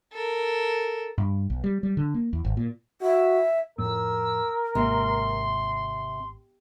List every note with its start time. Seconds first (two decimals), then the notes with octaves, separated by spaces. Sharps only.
0.13 A4 A#4
1.18 G2
1.50 B1
1.64 G3
1.83 G3
1.97 D3
2.14 A#3
2.33 E2
2.45 G#1
2.57 A#2
3.02 F#4 E5
3.78 F2 A2 A#4 E6
4.75 G#1 C3 A#3 C6